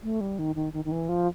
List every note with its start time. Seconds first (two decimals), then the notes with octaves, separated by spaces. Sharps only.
0.03 A3
0.21 G3
0.39 D#3
0.55 D#3
0.73 D#3
0.85 D#3
0.92 E3
1.09 F3